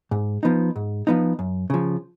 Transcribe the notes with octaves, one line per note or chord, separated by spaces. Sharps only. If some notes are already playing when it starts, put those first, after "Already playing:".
G#2
F3 B3 D#4
G#2
F3 B3 D#4
F#2
C#3 F3